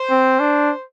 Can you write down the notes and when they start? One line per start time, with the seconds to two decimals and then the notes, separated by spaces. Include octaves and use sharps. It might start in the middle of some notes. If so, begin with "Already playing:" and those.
Already playing: C5
0.10 C4
0.40 D4